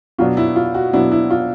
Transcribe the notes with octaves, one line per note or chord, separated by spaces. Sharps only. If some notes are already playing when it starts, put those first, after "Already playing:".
B2 F#3 B3 D4 F4
E4
F4
F#4
B2 F#3 B3 D4 E4
E4
F4